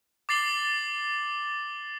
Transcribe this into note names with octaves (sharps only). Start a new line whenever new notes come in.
D6 A6 C7 F#7 G7